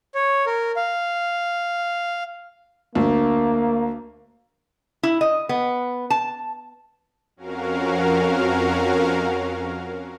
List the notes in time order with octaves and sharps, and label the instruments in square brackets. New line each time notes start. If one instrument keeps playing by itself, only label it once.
[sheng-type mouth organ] C#5
A#4
F5
[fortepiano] D2 [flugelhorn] A#3
[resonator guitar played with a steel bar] E4
D#5
B3
A5
[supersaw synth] F2 C#4 F#4 A#4 F5